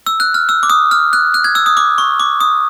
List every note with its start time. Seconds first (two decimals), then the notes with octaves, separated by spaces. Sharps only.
0.07 E6
0.20 F#6
0.34 F6
0.49 E6
0.63 D6
0.70 D#6
0.91 F6
1.13 F#6
1.34 F#6
1.44 G#6
1.55 E6
1.66 D#6
1.77 D6
1.98 C#6
2.20 D6
2.40 D#6